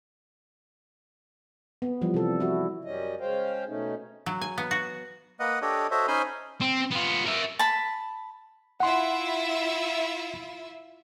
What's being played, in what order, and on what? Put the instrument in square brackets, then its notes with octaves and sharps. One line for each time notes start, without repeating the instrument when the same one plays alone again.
[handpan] B3
E3 F3 G3
C3 A4
E4 F#4
[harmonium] F#2 G3 C#4 D#5
C#3 G#3 C#4 C5 F5 G5
B2 A3 C#4 D#4
[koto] F#3
G#5
B3
F#4
[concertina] A#3 B4 D#5 F#5
D4 G4 A4 C#5 D#5
F#4 A4 C5 C#5 D#5 E5
C#4 D#4 C5 G#5 B5 C6
[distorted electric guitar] C4
B3 F4
A#4 E5
[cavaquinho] A5 B5
[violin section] E4 F4 E5 [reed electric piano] F#5 C6